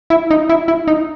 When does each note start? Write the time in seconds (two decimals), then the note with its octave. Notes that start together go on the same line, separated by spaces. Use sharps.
0.10 E4
0.31 D#4
0.49 E4
0.68 E4
0.88 D#4